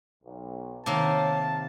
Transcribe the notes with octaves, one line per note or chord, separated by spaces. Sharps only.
B1
C3 D#3 A#3 C#5 A5